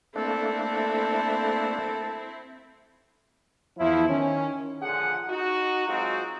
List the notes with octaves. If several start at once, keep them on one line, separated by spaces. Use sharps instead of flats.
A3 A#3 C4 D4 E4 A4
E2 F3 E4
D#3 C#4
A#2 D3 F3 F4 G#4 F#5
D#4 F#4
F#3 G#3 C4 D#4 F4 F#4